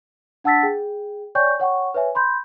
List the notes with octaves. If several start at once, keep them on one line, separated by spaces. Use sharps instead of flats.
D4 F#5 A5 E6 A6 B6
G#4 G5
C#5 D5 G5 G#5 C#6 G6
C#5 F#5 G5 C#6
B4 C#5 E5 G#5
B5 C6 G6